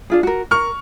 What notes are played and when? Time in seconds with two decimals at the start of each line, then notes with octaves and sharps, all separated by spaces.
0.10 D4 F4 G#4
0.23 F#4 A#4
0.51 A#4 C#6 F6